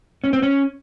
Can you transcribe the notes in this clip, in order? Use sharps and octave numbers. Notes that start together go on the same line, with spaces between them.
C#4
C4
C#4